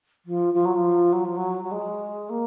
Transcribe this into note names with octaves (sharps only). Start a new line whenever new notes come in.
F3
F3
F#3
F3
F#3
F3
F#3
F#3
G#3
A#3